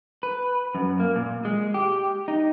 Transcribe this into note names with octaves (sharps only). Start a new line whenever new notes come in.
B4
F#2
A#3
A#2
G#3
G4
D#4